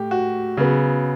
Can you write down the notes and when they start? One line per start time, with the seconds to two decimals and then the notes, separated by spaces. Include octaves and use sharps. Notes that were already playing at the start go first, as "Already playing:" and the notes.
Already playing: A2 G4
0.11 F#4
0.57 C#3 F#3 B3